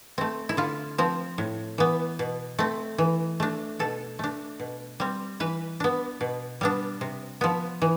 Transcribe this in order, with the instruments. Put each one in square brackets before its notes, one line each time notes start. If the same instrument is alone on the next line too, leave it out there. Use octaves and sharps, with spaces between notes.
[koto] A3 C4
E4
D3 F4
F3 C4
A2
E3 B3
B2
A3 C4
E3
A3 D4
B2 A4
A3 D4
B2
G3 C4
E3 B4
B3 D4
B2
G3 B3 D4
C3
F3 B3
E3